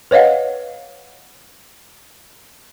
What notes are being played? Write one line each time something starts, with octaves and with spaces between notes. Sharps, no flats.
B4 C#5 D#5 F5 F#5